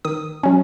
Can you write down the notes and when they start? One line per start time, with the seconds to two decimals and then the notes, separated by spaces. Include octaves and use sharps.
0.05 D#3 D#6
0.43 F#3 C#4